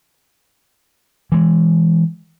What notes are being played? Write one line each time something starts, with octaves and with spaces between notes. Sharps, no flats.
E3 G#3